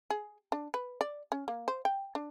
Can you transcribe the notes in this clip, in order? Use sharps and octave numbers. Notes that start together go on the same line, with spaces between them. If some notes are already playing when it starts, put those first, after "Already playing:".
G#4
D4
B4
D5
C#4
A#3
C5
G5
D4